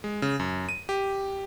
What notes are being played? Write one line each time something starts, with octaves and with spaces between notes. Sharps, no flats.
G#3
C#3
F#2
D#7
G4